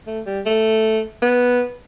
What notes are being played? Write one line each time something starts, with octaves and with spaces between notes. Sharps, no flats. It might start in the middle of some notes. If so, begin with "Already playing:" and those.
A3
G3
A3
B3